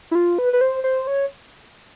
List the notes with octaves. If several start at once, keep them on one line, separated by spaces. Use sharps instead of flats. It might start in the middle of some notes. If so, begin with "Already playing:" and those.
E4
F4
B4
B4
C5
C5
C#5